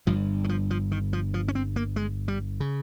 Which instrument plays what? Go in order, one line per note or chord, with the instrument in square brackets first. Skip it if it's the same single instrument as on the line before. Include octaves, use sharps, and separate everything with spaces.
[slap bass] G1 G2 F3
D#3
F3
F3
D#3
F3
F3
C#4
C4
A#3
G#3
G3
C#3